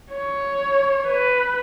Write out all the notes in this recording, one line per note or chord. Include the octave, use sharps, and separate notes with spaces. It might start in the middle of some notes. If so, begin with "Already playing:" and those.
C#5
B4